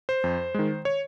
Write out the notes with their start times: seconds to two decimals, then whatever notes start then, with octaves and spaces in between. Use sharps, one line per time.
0.09 C5
0.24 F2
0.54 D#3 G#3
0.85 C#5